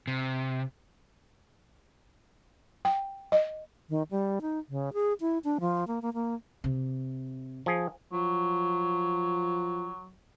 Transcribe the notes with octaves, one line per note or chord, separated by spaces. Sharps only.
C3
G5
D#5
D#3
G3
D#4
C#3
G#4
E4
D4
F3
A#3
A#3
A#3
C3
F3 G#4
F3 F#3